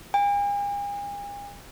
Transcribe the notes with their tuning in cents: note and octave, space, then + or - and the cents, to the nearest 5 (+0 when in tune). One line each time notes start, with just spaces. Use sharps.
G#5 -45